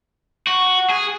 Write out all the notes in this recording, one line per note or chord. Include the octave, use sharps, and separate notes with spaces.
F#4
G#4